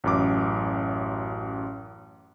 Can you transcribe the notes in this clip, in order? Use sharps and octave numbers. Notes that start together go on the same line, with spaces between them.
A1 F#2 D6